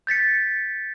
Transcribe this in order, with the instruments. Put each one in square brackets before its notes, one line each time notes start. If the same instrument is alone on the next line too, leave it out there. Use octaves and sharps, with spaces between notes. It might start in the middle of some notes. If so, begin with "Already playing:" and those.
[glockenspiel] G6 A6 B6 C#7